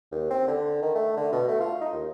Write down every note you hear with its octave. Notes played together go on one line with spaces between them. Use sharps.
D#2
C4
D3
D#3
A3
D3
B2
A3
F4
D#4
D#2